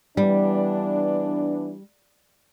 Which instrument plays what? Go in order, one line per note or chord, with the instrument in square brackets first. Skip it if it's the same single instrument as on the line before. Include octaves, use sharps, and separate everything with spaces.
[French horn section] E3 B3 D4 [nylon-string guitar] G3